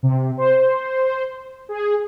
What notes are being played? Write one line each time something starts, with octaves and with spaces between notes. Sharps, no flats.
C3
C5
G#4